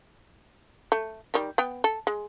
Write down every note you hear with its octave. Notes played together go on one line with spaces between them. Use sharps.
A3
D#3 G3
B3 G5
A4
G#3